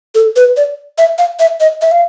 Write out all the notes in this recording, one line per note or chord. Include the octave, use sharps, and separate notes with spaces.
A4
B4
D5
E5
F5
E5
D#5
E5
F5